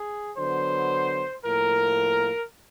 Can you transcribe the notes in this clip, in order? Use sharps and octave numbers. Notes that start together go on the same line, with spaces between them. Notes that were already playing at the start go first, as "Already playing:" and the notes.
Already playing: G#4
D3 F#3 B3 C5
A2 F3 A#3 A#4